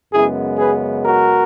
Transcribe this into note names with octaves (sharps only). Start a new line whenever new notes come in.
F#2 C#3 G#3 B3 E4 G#4
G#4 B4
F#4 A#4